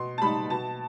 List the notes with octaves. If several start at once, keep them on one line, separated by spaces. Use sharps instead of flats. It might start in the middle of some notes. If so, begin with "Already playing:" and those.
Already playing: B2 C6
A5
G3 D#4 B5
B2 A5